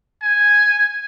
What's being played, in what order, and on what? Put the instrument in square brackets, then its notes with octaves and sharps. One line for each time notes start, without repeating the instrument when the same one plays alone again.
[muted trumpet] G#5